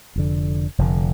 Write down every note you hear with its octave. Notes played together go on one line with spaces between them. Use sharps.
F1 F2 D3
F1 F2 D3